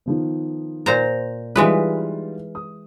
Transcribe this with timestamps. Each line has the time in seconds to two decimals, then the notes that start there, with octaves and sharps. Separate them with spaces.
0.06 D#3 F3 B3
0.86 A#2 C5 A#5
1.56 E3 G3 G#3 D#4 F4 B4
2.55 D#6